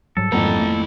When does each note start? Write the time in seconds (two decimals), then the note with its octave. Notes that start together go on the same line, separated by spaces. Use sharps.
0.17 G#2 F#3 G3 A4
0.32 G#1 F2 A#3 E4 A#5
0.59 A3